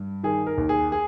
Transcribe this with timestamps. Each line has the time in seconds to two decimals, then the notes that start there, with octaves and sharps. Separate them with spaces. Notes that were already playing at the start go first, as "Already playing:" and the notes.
Already playing: G2
0.23 D#3 G#4
0.47 A#4
0.58 D#2
0.69 G#4
0.92 G#4